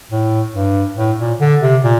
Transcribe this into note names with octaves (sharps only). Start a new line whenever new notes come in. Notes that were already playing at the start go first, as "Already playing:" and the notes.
A2
G2
A2
A#2
D3
C3
A#2